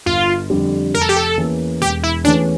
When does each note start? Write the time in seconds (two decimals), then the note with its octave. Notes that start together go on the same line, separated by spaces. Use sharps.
0.06 G1 F4
0.50 F2 D3 G3
0.94 F1 A#4
1.01 A4
1.09 G4
1.16 A4
1.37 E2 E3 A#3 C#4
1.81 E1 G4
2.03 E4
2.24 E2 E3 A3 C#4 D4